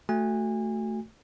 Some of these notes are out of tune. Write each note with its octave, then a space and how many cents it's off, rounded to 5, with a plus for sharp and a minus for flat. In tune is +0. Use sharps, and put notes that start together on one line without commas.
A3 +0 F#4 +0 G#5 -30